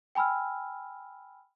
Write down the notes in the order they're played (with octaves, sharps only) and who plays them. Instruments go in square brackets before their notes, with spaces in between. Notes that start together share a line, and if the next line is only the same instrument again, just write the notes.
[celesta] G5 G#5 B5 E6 F6